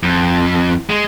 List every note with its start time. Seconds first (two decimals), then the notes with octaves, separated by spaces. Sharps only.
0.03 F2
0.90 G#3